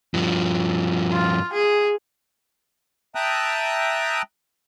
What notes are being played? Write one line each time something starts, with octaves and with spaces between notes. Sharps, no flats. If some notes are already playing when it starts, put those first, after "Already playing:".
G2 F3
F4
G#4
E5 G5 A5 A#5 D#6 F#6